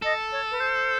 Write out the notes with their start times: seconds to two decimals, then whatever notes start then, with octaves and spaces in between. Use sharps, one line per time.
0.02 A4 D#5
0.32 C#5
0.51 B4
0.60 C5